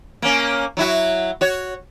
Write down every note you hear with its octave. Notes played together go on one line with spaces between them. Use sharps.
A#3 C#4
F#3 E4 F#4
F#4 C#5